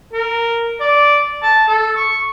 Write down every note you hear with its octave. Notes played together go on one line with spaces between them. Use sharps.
A#4
D5
A5
A4
C#6